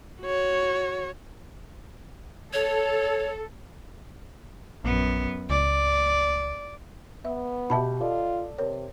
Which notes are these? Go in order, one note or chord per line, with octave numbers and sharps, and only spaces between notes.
F#4 C#5
A4 C#5
A#1 F#2 B3
C#2 D5
B3 E5
B2 G4 E5 A5 B5
F4 A4 D5 D#5
C3 A#4 C#5